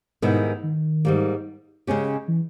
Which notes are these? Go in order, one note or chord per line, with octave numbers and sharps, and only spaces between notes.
G#2 B2 D#3 G3 B3 E4
D#3
G#2 G3 A#3
C#3 G#3 C#4 G4
E3